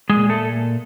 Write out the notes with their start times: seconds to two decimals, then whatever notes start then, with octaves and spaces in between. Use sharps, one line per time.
0.09 G#3 G#4
0.16 A#2
0.29 A3 A4